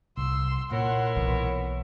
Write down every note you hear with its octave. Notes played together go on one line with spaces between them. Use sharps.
C2 C6 E6
A#2 E4 A#4 C#5 F#5 C6
B1 E3 B3